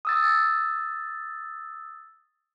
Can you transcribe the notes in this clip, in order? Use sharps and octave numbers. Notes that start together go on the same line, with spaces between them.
D#6 E6 A6